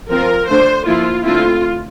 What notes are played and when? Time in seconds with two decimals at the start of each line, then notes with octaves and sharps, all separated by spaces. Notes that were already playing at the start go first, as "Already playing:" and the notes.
0.10 F3 C4 F4 A#4
0.48 D3 A3 D4 C5
0.86 F3 A#3 E4 F4
1.23 D3 A3 C4 E4 F4